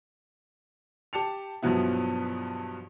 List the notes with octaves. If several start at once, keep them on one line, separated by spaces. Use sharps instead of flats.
G4 A5 C#7 F7
G2 B2 F3 F#3 B3 E4